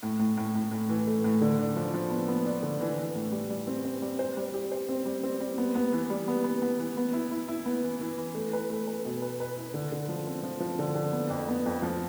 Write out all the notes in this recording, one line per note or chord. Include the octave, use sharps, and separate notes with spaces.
A2
A2
A2
A2
A2
E3
A3
A2
D3
D4
F3
F3
B3
B3
D4
D3
E3
E3
A2
G3
G3
C4
C4
G3
C5
G3
G4
C5
C4
G3
C4
G3
B3
B3
E3
G3
B3
B3
B3
E3
B3
E4
E4
E4
B3
E3
E3
E3
A3
B4
A3
B4
B2
B4
B4
E4
D3
D3
F3
C4
F3
F3
D3
D3
B3
F2
B3
F2
F3